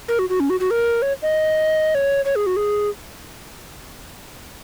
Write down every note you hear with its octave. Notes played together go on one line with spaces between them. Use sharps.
A#4
F#4
F#4
C#4
F#4
F#4
A#4
C#5
D#5
C#5
C#5
G#4
F#4
G#4